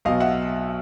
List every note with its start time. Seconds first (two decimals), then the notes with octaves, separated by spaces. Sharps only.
0.05 B1 B2 D#5 F5
0.20 E5 F#5